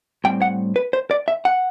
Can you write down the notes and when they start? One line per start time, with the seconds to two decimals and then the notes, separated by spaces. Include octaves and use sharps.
0.24 A2 G3 C4 G5
0.42 F#5
0.76 B4
0.93 C5
1.11 D5
1.28 E5
1.45 F#5